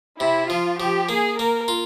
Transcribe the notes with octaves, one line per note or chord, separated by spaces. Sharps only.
C3 E4
F3 F4
F3 G4
A#3 G#4
A#3 A#4
F4